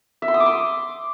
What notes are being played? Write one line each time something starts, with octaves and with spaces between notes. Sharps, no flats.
E5
C6
D#6
D6
C6